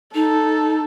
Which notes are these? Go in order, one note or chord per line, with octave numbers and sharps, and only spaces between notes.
D#4 A4